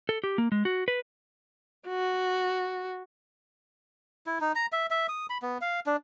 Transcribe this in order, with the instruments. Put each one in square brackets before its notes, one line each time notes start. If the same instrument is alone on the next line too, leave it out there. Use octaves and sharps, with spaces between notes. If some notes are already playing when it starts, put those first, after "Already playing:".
[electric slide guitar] A4
G4
A#3
G#3
F#4
B4
[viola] F#4
[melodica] E4
D#4
A#5
E5
E5
D#6
B5
B3
F5
D4